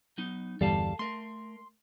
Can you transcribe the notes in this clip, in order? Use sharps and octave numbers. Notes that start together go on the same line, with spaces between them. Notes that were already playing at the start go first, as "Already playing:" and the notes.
F#3 B3 D#4
G1 E2 G3 A4 F5 A5
A3 A#4 C6